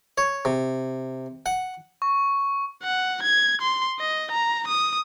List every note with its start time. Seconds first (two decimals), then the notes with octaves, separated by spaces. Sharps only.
0.18 C#5
0.45 C3
1.46 F#5
2.02 C#6
2.83 F#5
3.23 G#6
3.62 C6
4.00 D#5
4.32 A#5
4.67 D#6